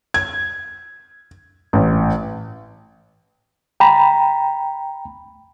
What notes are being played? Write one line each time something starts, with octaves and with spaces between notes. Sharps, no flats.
G#6
A1
G5 A#5 B5